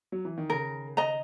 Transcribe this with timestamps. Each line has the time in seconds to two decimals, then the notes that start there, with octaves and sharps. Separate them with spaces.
0.12 F#3
0.25 E3
0.38 D#3
0.49 C#3 A#4
0.97 D#5 A#5